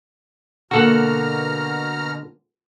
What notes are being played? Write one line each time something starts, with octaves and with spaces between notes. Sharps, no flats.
B2 D3 A#3 F#4 A4 F#5 A#5 F6